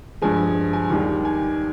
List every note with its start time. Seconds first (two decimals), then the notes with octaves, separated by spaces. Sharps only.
0.22 G2 F3 G#3 G#5
0.73 G#5
0.90 D#2 D#3 G3
1.25 G#5